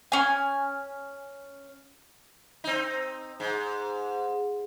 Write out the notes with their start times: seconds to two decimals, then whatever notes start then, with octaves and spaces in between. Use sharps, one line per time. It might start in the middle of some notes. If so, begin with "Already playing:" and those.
0.12 C#4 G#5
2.64 C4 D#4
3.40 G#2